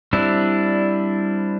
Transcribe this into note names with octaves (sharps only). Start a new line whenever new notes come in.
G3 C4 D4 E4